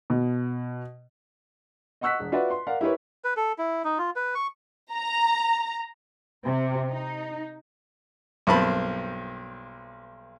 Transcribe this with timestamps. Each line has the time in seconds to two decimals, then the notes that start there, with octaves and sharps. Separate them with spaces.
0.10 B2
2.01 D#5 F#5 C#6 E6 F#6 B6
2.19 E1
2.32 F4 F#4 B4 D5 E5 F#5
2.50 C6
2.67 A#4 D5 F5 F#5
2.81 E4 G4 A#4 B4 C#5
3.24 B4
3.37 A4
3.58 E4
3.84 D#4
3.98 F4
4.16 B4
4.35 C#6
4.92 A#5
6.45 C3
6.90 D#4
8.47 B1 G2 A#3 C4 A5 B5